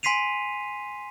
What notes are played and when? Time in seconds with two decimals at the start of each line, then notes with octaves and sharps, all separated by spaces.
0.03 G#5 C6 B6 C7 D#7 F7